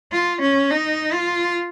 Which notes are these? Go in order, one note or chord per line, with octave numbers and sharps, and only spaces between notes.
F4
C#4
D#4
F4